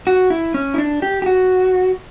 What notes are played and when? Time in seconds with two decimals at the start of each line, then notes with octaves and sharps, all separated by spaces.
0.07 F#4
0.30 E4
0.54 C#4
0.74 E4
0.78 D4
1.02 G4
1.22 G4
1.26 F#4